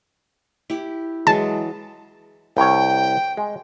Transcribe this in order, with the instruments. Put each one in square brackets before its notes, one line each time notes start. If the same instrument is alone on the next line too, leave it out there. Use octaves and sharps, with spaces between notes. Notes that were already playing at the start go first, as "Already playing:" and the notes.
[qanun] E4 G4
[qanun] E3 F#3 G#4 [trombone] G#3 [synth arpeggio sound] A5
[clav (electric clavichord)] C2 C#5 [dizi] G5
[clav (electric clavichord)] G#3